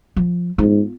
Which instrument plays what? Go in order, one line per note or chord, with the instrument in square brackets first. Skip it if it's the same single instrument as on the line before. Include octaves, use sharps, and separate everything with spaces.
[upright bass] F3
[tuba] G#2 [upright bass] B3 F4